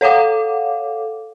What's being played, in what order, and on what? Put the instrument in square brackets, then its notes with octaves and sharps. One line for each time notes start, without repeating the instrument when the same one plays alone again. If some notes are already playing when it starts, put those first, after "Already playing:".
[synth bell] A4 C#5 F5 F#5 D6